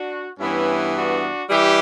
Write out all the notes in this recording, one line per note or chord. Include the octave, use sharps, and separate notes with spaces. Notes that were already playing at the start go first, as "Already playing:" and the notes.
Already playing: D4 F#4
G2 E3 B3 C#4 E4
D4 F#4
E3 G3 E4 G4